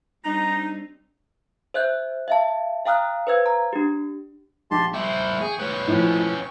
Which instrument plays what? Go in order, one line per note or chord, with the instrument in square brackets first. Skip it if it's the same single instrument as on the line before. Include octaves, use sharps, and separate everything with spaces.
[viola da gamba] G3 C4 D4 [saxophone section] D#4 [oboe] A#5
[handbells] C5 E5 F#6 G6
E5 F5 A5
F5 G5 A#5 D#6 F6 F#6
B4 C5 F5 E6 G#6
A#5
D4 G4
[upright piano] A#1 [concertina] G4 A5 C6
[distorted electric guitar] E4 C5 [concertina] G5 C#6
[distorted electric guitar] G#4
C#4 B4
[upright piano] A2 F3